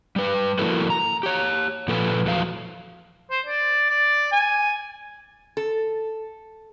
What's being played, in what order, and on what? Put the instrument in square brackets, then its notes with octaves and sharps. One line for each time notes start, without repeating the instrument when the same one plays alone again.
[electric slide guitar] G3 B4
F3 A#3 E4 F#4 A4 A#4
A#5
G4 C#5
A#2 F3 A4 B4
E2 F3 F#3 F5
[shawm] C5
D5
D5
G#5
[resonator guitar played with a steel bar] A4